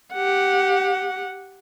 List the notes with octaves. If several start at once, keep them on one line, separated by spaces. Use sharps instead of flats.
G4 F#5